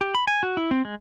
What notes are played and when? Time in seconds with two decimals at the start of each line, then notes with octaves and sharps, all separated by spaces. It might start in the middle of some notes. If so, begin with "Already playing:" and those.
0.01 G4
0.15 B5
0.27 G#5
0.43 F#4
0.57 E4
0.71 C4
0.85 G#3